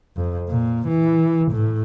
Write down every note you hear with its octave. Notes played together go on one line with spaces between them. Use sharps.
F2
A#2
E3
A2